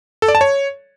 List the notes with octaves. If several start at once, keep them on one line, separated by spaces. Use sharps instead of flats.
A4
D5
A5
C#5